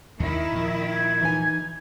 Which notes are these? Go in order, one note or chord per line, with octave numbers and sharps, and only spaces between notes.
D#2 D#3 E4
A#2 F3
G#6
E3 D#4 G#5